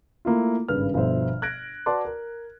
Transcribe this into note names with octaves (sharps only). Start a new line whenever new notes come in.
A3 A#3 E4 F4
G#1 G2 C#3 B4 F6
G1 B2 F3 C5 E5
F#6 G#6 A#6 D7
F#4 B4 D5 A5 C6 D6
A#4